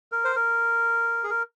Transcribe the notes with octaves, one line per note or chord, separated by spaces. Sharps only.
A#4
C5
A#4
G#4
A#4